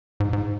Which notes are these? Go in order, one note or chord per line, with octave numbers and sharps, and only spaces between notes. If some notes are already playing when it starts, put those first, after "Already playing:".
G#2
G#2